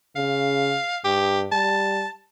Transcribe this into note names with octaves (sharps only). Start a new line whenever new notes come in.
C#3 F5
G2 G4
G3 A5